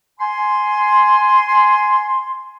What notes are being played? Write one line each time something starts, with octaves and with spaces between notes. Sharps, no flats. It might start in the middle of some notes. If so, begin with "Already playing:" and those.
G#5 C6